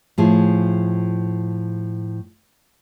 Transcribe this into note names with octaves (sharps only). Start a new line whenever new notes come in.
A2 F3 G#4